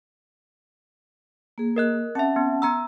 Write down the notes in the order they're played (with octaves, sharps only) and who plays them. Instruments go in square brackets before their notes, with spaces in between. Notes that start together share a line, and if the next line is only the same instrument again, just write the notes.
[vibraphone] A#3 G#4
[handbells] A#4 D#5 F#6
[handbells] C4 E5 [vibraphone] C#4 F#5 A5
[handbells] B3
B3 A#5 E6